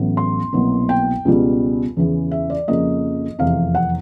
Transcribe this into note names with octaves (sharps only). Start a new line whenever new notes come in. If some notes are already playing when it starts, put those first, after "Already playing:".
Already playing: A1 A2 F#3 B3
C6
C2 B2 F#3 A#3
G5
C#2 B2 G3
E2 C#3 E3
E5
D5
F2 C#3 F3 A#3 D#5
F1 E2 C3 F5
F#5